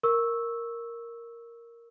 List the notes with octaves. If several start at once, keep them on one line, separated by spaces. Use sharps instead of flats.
A#4 C#6 E6